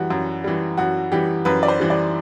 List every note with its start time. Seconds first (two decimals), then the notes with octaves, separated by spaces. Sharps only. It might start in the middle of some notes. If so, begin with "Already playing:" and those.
Already playing: F#2 E3 G3 F#4
0.10 F#2
0.44 E3 G3
0.77 F#2 F#4
1.12 E3 G3 G4
1.45 F#2 B4
1.63 D5
1.68 C5
1.80 E3 G3
1.90 D5